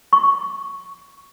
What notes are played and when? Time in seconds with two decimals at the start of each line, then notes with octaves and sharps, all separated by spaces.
0.13 C#6